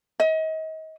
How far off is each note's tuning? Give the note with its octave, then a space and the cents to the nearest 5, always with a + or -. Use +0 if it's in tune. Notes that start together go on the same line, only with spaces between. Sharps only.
D#5 +35